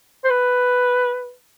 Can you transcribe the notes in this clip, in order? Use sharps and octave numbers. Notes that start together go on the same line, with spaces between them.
C5
B4